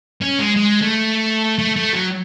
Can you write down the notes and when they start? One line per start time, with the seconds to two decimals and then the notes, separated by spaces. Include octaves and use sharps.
0.22 C#4
0.39 G#3
0.56 G#3
0.82 A3
1.59 A3
1.76 A3
1.93 F#3